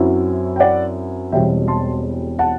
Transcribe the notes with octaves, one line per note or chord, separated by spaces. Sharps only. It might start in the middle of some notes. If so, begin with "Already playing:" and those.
Already playing: F#2 F#3 C4 E4
G5
D5 F#5
E1 E2 B2 G3 C4 E5 G5
A5 C6
F#5 A5